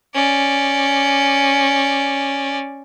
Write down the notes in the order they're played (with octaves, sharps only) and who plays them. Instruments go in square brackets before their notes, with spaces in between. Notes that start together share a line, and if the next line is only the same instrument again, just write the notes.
[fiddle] C#4 D5